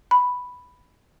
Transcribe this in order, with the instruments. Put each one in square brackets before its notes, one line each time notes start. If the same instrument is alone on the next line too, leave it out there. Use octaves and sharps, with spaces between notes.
[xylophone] B5